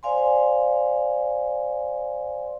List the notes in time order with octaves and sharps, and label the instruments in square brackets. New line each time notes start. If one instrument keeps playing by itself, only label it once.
[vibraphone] C5 D5 F5 G#5 C6